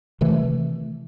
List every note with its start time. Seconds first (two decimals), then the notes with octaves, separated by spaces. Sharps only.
0.21 C3 D#3 E3 A3